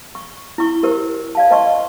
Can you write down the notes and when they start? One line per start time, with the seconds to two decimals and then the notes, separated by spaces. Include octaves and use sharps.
0.15 C#6
0.58 E4 C#6
0.83 G4 A#4 C5
1.35 D5 F5 A5
1.51 C5 D#5 A5 C6 C#6